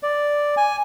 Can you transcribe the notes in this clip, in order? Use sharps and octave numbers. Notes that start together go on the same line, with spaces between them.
D5
G#5